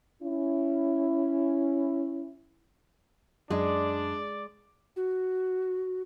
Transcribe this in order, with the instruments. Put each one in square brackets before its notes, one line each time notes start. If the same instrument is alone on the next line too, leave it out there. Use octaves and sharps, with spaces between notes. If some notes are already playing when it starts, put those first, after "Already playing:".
[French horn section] C#4 E4
[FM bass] F#2 [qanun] G#3 [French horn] D4 [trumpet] D5
[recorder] F#4